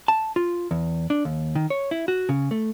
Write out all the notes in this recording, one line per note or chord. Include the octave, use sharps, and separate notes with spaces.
A5
F4
E2
D4
D#2
D#3
C#5
E4
F#4
C#3
A3